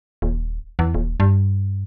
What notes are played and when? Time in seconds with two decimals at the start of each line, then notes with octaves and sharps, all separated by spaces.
0.22 D#1
0.79 E2
0.94 D#1
1.20 G2